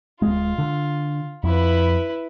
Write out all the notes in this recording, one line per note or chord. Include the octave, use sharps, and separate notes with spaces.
D1 G#3 F4
D3
F2 E4 B4